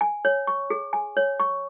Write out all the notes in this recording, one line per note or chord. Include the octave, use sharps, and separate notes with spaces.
G#5
C#5
C#6
G#4
G#5
C#5
C#6